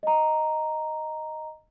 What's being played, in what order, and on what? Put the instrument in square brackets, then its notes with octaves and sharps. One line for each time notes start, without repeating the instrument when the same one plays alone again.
[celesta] D#5 A#5